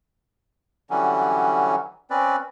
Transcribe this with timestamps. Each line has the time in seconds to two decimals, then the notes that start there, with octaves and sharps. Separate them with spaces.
0.90 D3 E3 F#3 G3 C#4
2.10 C4 C#4 B4 D5